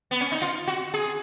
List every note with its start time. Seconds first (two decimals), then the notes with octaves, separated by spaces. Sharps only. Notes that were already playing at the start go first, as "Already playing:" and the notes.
0.11 B3
0.21 C#4
0.32 D#4
0.42 F4
0.68 F#4
0.94 G#4